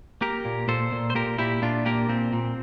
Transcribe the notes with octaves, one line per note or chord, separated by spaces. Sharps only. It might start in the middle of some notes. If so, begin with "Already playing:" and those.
A#3 G4 A#4
A#2
A#2 A4 C5
A#2
C5
A#2 G4 A#4
A#2 E4 G4
A#2 D4 F4
A#3 G4 A#4
A#2 C4
A#2